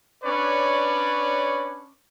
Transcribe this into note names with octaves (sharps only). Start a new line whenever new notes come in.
C#4 D4 B4 C#5 D5